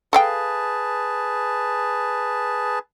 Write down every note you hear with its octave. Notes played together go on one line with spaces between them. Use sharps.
G#4 A4 B4 F5 G5 A5